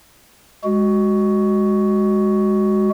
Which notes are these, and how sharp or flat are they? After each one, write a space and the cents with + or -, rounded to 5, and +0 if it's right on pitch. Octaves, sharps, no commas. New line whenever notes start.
G#3 -10 F#4 +10